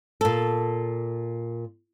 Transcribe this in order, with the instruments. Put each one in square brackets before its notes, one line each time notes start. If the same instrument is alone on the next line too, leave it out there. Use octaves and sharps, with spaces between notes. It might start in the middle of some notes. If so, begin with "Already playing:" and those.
[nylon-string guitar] A#2 A4